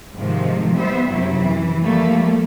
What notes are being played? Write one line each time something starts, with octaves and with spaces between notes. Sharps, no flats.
G#2 C3 D#3 F3 G#3
G3 B3 C5 E5
F#2 C3 F#3 E4
E3
F3 G3 A3 A#3